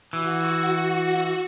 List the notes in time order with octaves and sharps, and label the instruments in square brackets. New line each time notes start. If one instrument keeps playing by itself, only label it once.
[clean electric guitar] E3 [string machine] F#4